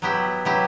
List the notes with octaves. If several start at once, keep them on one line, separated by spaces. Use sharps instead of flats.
F#3 B3 E4 G4
F#3 B3 E4 G4